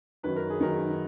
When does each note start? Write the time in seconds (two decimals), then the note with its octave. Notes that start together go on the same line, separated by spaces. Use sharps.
0.23 F#2 D#3 F#3 B4
0.36 A#4
0.50 G#4
0.60 F#2 D#3 F#3 A#4